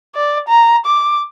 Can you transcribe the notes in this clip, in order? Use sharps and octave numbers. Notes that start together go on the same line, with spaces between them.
D5
A#5
D6